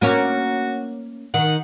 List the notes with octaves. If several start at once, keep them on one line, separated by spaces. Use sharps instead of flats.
A#3 C#4 F#4
D#3 F#5